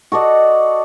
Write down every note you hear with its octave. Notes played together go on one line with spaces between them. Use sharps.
F#4 A4 D5 D#5